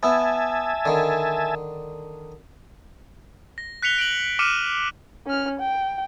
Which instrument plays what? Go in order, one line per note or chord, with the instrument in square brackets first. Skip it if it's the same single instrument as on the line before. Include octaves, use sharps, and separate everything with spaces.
[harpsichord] B3 E4 [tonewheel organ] E5 G#5 A5
[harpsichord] D3 D#3
[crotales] A#6
F#6 B6 C#7 F7 G7
D7 F#7
D6 F6 C#7 D#7 E7
[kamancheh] C#4 F6
G5